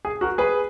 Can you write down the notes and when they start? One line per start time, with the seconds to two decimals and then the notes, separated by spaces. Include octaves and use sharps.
0.05 G#4
0.21 F#4 A#4
0.38 G#4 B4